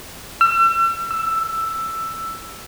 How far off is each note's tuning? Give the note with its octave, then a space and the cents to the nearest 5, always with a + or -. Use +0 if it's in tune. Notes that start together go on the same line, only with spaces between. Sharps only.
E6 +40
E6 +10